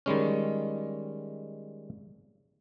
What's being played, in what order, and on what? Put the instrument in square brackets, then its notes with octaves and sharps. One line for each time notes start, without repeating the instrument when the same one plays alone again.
[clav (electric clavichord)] D#3 G3 G#3 C#4